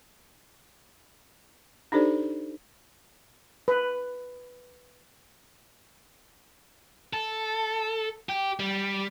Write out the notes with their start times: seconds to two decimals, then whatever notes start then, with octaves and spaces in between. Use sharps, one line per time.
1.92 D4 D#4 G4 A4 C5 D5
3.68 B4
7.13 A4
8.29 G4
8.60 G3